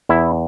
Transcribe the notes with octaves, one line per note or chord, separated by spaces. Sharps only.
E2 E4